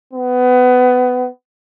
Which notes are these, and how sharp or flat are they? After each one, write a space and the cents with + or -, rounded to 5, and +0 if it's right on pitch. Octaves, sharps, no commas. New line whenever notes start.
B3 +20